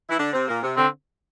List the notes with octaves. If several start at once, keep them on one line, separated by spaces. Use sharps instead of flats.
E3 E4
D3 D4
C3 C4
A#2 A#3
C3
D3 C4